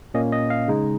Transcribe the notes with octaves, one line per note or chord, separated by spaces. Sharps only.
A#2 A#3 C#4 D#5
D#5
F5
C#3 G#3 D#4